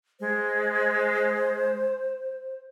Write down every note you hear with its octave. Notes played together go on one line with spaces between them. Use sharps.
G#3 C5